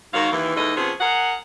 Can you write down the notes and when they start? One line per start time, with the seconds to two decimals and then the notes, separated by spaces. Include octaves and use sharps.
0.14 G#2 D#3 F#4 C#5 F5
0.32 D#2 E3
0.56 D#2 G#2 E3 A4 D#5
0.76 C3 F3 B3 C#4 G#4
1.00 G#4 A#4 F#5